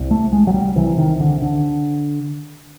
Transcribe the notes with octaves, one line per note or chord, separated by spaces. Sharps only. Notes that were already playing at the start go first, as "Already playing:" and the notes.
Already playing: C2 C3
A3
G#3
F#3
G3
C2 C3 E3
D#3
D3
D3